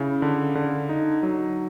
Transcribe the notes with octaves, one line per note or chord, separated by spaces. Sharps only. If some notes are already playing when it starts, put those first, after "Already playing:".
Already playing: C#3 E4
D3
D3
D#4
F#3